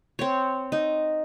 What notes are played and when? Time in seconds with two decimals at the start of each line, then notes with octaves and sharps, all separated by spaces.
0.19 C4 C#5
0.72 D#4